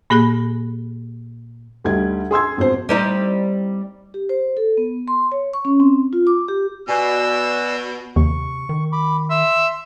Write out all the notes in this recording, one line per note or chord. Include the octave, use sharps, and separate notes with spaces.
A#2 A#3 G4 G#4 B5 A#6
D2 G3 D#4 G#6
G#4 C6 E6 G#6
G#1 F2 B2 C5
G3 C4 D#4
G4
C5
A4
B3
C6
C#5
C#6
C#4
C4
F4
D6
G4
B2 D5 G#5 E6
D#2 C3 C#6
D#3
B5 D6
E5 C6